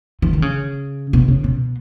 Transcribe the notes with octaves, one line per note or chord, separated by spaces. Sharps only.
E3
D#3
C#3
B2
C#3
B2